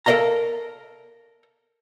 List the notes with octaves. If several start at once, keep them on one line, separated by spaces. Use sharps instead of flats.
A4 A#4 C5 D#5 F5 A#5